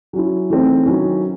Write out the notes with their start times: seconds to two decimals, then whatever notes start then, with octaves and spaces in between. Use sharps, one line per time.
0.13 F#3 C#4 E4
0.50 E3 A3 C4 D#4
0.85 D#3 F#3 C#4 E4